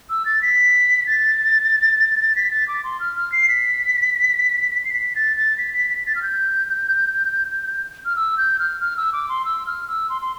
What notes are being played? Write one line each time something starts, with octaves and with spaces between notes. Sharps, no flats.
E6
A6
B6
A6
B6
A6
D6
C6
F6
F6
C7
B6
C7
B6
A6
A6
B6
B6
B6
A6
F6
G6
F6
E6
G6
F6
F6
E6
D6
C6
E6
F6
E6
C6
C6